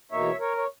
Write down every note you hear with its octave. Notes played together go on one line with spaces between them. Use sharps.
E2 B2 A#3 D#4 C#5 E5
A#4 C#5
C#5